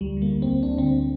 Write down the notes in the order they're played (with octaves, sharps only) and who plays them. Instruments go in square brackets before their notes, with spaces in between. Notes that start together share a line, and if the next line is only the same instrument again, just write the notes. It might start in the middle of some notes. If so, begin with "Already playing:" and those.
[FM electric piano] D2 G3
D3
A#3
D2
D2 C4
D2 D4
D3 C4